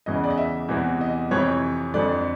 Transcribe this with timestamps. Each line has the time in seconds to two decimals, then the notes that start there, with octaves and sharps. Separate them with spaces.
0.06 E2 C#3 E3 D#5
0.24 D5
0.30 D#5
0.37 E5
0.69 E2 C3 E3
1.01 D#5
1.31 F2 C3 E3 C#5
1.94 F2 D3 D5